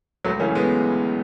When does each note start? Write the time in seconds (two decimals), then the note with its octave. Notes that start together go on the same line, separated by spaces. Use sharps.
0.25 C#2 F#3 A3
0.40 C#3 E3 A3 C#4
0.55 G#3 B3